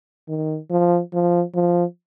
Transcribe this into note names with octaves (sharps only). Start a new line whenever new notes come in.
D#3
F3
F3
F3